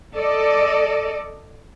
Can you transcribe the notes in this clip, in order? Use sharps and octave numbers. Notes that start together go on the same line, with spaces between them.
A4 D5 D#5